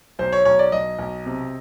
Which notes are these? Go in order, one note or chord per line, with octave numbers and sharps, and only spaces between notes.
B1 C5
C#5
B1 C#5
D5
B1 D#5
B1
C3